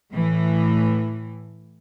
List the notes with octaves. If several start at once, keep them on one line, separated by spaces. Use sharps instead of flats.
A2 E3